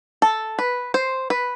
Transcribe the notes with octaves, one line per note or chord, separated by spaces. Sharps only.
A4
B4
C5
B4